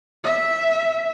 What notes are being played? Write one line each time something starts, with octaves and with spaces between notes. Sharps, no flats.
E5